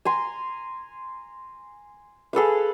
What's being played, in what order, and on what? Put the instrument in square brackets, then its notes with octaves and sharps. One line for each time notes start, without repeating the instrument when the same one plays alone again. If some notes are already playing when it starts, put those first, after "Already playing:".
[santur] G#5 A#5 C6
G#4 A4 B4 F5